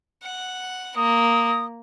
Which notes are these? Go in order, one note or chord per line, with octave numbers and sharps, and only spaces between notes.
F#5
A#3 D#6